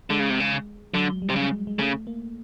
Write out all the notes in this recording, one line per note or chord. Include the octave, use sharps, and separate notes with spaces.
D3 G#3
C#3
C3
C#3
D3 F#3
G3
C3
C#3
G#3
G#3
C#3 A3
A#3